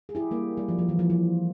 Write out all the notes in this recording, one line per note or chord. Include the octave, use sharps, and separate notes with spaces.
G#4
E4 G4
G3 A#3
G3
F3
F3
E3
F3
F3